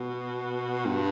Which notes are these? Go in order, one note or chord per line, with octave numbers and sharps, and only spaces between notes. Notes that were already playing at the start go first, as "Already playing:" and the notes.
Already playing: B2
G2